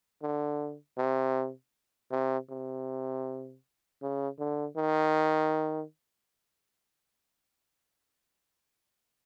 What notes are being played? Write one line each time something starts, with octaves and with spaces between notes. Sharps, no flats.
D3
C3
C3
C3
C#3
D3
D#3